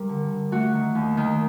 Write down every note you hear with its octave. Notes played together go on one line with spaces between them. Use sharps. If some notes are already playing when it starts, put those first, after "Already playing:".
Already playing: G2 G3 A#4
D3
D3
A3 F#4
D#3
D#2
D#3